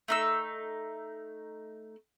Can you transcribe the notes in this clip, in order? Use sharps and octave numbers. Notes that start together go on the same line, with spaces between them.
A3 D#4 E6